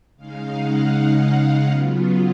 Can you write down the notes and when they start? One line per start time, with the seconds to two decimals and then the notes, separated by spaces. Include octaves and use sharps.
0.17 C#3 G#3 D#4 F5
0.54 F#5
0.93 F5
1.69 C#3 F#3 B3 F4